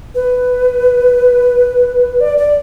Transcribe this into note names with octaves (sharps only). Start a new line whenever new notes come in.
B4
D5
D5